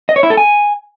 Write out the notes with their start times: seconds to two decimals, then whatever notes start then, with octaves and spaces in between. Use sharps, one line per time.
0.09 D#5
0.16 C#5
0.23 E4
0.30 A4
0.37 G#5